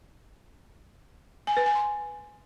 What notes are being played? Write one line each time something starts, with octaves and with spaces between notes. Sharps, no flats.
G#5
B4
G#5
C6